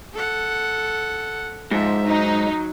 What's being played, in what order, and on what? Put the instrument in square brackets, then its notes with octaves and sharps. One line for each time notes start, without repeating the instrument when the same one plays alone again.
[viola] A4 F#5
[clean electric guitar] G#2 [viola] F3 E5
[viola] F#3 [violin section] D#4